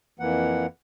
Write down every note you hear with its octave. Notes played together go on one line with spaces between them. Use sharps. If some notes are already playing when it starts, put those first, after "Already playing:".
F2 E3 A#3 F#5